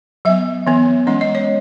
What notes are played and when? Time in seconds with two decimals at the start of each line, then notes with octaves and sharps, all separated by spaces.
0.25 F#3 B3 E5
0.67 E3 B3
1.07 E3 G#3 C#4 D#5
1.21 D#5
1.35 C#5